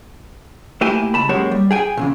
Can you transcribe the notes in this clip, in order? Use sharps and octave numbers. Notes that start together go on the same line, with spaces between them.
A3 A#3 E4 G4 G#5
C#2 A5 B5
F#2 G#3 A#3 G4 C#5
G3
G#4 G5 G#5
A#2 C#3 E3